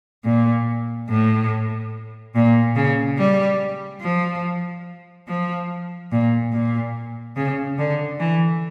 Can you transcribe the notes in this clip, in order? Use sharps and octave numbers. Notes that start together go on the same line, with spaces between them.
A#2
A2
A#2
C#3
G3
F3
F3
A#2
A#2
C#3
D3
E3